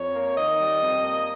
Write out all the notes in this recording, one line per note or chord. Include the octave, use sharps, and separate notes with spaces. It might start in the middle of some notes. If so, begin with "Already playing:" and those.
Already playing: F2 C#5
A#3
D#3 D#5
G3
F2
A#3